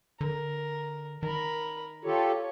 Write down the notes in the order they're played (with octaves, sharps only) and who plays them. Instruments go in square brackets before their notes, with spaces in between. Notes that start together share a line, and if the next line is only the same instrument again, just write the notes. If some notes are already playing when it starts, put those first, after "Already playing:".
[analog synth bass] D3 [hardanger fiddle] A#4
[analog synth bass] D#3 [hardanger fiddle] A#4 B5
[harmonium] F4 G4 A4 [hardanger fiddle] C#5